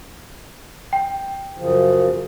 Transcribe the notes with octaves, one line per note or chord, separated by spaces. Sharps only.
G5
F#2 C#3 F3